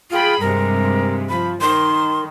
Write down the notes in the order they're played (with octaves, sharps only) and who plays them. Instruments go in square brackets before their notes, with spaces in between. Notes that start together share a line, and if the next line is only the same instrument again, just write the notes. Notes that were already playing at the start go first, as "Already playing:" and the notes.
[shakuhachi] F4 [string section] G#4 G5 B5
[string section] G2 C3 G#3 [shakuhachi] A#4
[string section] F3 [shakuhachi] B5
[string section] D#3 [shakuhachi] C6